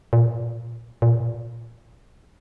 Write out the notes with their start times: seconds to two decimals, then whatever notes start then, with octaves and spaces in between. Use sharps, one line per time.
0.13 A#2
1.02 A#2